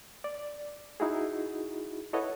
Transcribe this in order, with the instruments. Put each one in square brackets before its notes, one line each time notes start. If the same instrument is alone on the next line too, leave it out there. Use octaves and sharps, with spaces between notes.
[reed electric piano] D5
D#4 E4 F#4 G#4
E4 A4 B4 C#5 D#5 F#5